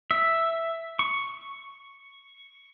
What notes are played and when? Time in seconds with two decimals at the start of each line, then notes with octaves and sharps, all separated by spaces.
0.11 E5
0.99 C#6